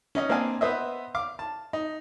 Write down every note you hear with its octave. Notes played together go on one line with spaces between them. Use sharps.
C#4 D#4 D#5
A#3 C4 D4 D#5 F5 G#5
B3 B4 C5 D#5 E5
F5 D6
A5
D#4